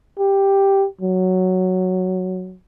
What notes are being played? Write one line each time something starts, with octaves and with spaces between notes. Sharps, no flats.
G4
F#3